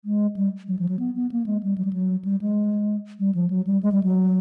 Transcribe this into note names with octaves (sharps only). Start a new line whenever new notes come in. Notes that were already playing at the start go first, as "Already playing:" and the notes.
G#3
G3
F#3
F3
F#3
B3
B3
A#3
G#3
G3
F#3
G3
F#3
G3
G#3
G3
F3
F#3
G3
G#3
G3
F#3